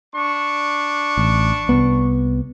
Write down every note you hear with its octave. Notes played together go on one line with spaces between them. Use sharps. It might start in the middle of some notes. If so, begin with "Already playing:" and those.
D4 C#6
A1
C2 B3